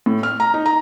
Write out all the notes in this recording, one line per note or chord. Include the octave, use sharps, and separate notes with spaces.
A2
F6
A#5
D#4
A#5